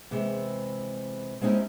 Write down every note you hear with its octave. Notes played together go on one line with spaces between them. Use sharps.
C3 E3 G#3
G#3 C4 C#4 D#4 E4 G4